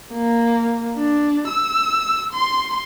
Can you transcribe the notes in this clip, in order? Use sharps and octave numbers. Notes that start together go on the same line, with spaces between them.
A#3
D4
E6
C6